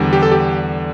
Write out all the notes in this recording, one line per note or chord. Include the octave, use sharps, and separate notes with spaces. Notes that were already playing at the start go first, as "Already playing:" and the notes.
Already playing: E2 D3 G3
G4
A4
G4